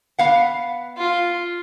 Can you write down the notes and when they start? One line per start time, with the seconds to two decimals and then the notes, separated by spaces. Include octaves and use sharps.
0.19 B3 F5 F#5
0.98 F4